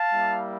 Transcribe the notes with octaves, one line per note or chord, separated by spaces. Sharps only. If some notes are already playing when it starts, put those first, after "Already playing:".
Already playing: F5 A5
G3 A#3 E4